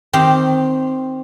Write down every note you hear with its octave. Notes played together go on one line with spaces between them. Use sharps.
D#3 C4 G4 G5